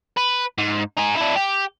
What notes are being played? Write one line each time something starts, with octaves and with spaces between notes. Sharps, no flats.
B4
G#2
D#4 G#4
D4 E4
G4